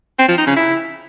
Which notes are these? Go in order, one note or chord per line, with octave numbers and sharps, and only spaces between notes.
C4
F3
D#4
C#3
E4